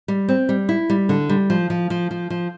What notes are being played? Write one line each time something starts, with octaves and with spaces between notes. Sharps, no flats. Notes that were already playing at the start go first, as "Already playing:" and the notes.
G3
C4
G3
E4
G3
D3
G3
F3
F3
F3
F3
F3